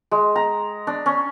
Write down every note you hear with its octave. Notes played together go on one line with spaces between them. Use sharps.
G#3
A#5
D4
C#4